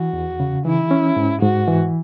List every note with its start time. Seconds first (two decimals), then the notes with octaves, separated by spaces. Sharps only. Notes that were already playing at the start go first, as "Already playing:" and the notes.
Already playing: E3 F#4
0.13 E2
0.40 C#3
0.65 E3 E4
0.91 C#4
1.16 G#2
1.42 G#2 F#4
1.68 E3